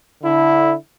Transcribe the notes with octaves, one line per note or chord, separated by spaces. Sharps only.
D3 E4